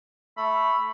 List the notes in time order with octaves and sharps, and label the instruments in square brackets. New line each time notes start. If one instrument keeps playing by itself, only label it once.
[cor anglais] A3 [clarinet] B5